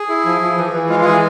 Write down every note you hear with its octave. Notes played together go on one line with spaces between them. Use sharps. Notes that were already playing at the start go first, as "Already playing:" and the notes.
Already playing: G#4
E4
F3
F3
E3
E3
G#3 F4
F4
E3 G#4